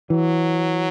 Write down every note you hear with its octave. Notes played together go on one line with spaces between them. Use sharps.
E3 F#3